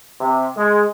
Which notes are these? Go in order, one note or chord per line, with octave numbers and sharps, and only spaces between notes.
C3
G#3